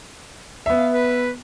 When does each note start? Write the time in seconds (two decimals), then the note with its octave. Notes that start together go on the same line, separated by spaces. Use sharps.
0.66 B3 E5
0.78 F5
0.92 B4